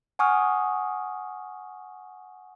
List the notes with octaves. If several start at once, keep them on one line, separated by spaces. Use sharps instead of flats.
F#5 G#5 C#6 D#6 F6